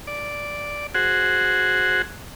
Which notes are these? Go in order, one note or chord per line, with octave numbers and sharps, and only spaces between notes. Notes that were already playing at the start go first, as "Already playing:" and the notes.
D5
F#4 G#4 C5 F#5